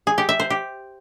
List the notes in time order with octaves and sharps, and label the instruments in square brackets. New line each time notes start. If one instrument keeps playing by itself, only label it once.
[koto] G#4
G4
E5
C5
G4